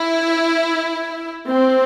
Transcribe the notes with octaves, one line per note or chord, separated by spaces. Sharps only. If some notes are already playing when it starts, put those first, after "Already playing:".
Already playing: E4
C4